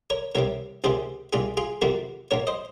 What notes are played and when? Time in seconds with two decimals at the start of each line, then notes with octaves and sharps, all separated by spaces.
0.10 A#4 C#5
0.35 C2 C3 D#3 A#4 C#5
0.84 C#2 C3 D#3 G#4 C5
1.33 C2 A#2 F4 G#4
1.57 F4 G#4
1.82 F2 C3 D#3 F#4 A#4
2.31 A#1 A#2 A#4 C#5
2.47 C5 D#5